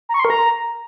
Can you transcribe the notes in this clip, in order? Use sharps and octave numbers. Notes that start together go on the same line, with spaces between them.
A#5
C#6
C6
A#4
A#5